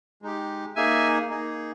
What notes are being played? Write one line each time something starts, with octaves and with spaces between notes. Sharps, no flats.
G#3 D#4 G4
A#3 D#4 G#4 E5 G#5
A#3 D#4 G#4